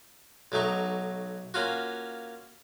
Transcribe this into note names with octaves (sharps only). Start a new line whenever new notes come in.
B1 F#3 A3 D#4 C#6
A#3 C#4 F4 F#4